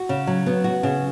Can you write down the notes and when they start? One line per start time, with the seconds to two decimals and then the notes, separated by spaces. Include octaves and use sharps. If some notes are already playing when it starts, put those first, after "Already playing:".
Already playing: F#4
0.09 C#3
0.27 F#3
0.46 B3
0.64 F#4
0.83 C#3